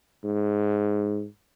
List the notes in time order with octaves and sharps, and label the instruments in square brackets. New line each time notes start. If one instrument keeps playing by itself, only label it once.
[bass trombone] G#2